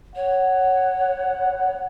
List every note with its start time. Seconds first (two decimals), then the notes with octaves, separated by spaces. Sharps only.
0.16 C#5 F#5